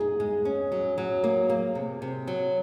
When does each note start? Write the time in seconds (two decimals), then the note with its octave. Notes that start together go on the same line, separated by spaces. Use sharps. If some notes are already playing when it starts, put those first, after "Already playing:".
Already playing: D#4 G#4
0.20 G#3
0.45 C#4
0.72 F#3
0.98 F#3
1.24 A#3
1.50 A#3
1.75 C3
2.02 C3
2.27 F#3